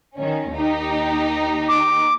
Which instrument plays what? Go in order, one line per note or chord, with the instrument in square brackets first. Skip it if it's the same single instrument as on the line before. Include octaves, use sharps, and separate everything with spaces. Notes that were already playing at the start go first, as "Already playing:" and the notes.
[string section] D#3 C#4
D#2 D#4 G4
[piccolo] D6